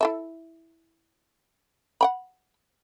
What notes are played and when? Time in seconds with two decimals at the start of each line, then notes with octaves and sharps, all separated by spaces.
0.01 E4 A4 E5
2.01 F#5 G5 B5